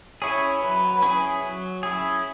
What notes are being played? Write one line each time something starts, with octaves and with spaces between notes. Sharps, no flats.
C#4 E4 G#4 C#5
F#3 B4
C#4 E4 G#4
F#3
C#4 E4 G#4